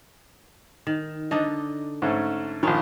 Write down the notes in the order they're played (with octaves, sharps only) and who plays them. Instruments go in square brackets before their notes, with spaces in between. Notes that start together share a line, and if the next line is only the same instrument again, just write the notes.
[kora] D#3
[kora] D3 D4 D#4 [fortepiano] D#5
[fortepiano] G#2 A3 C#4
[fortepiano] A#1 D#3 [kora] C#4 F4